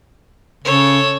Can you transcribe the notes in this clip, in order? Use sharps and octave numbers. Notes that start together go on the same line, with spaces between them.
C#3 A4 C#5